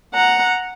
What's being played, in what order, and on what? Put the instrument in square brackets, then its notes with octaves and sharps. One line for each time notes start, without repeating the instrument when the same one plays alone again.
[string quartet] F#5 A#5